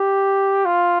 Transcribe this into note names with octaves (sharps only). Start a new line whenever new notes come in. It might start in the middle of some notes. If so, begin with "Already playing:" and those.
Already playing: G4
F4